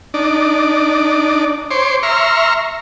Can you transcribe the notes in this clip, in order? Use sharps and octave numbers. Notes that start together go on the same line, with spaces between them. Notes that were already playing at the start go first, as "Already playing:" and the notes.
D4 D#4 D5
C5 C#5 C6 D6
E5 A#5 C6 C#6 F6